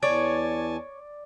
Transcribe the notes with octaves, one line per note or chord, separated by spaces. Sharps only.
E2 C#5 D5 G#5 A5